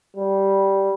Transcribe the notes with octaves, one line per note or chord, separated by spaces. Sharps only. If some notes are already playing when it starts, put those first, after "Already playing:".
G3